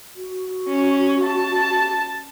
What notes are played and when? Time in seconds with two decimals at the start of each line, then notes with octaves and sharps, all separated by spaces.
0.16 F#4
0.69 C#4
1.24 A5